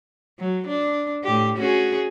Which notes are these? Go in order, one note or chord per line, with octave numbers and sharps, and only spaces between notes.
F#3
D4
A2 G4
C#4 F#4 G#4